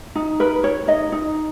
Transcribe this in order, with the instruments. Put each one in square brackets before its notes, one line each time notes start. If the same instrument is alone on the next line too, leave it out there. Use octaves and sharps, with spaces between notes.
[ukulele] D#4
A#4 B4
A#4 C#5
D#4 D#5
D#4